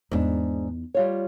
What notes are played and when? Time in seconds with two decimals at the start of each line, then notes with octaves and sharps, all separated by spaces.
0.11 E2 G#2 D4 D#4
0.94 G3 F4 C#5